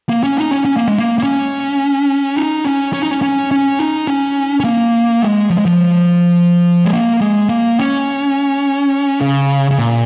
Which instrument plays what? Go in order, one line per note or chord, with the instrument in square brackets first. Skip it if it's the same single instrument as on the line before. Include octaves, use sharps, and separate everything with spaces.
[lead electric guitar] A#3
C#4
D#4
C#4
C#4
A#3
G#3
A#3
A#3
C#4
D#4
C#4
C#4
D#4
C#4
C#4
C#4
D#4
C#4
C#4
A#3
G#3
F3
G#3
F3
G#3
A#3
G#3
A#3
C#4
C#3
C#3
A#2